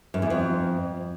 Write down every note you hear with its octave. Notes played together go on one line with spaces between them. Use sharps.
F#2
E2
F2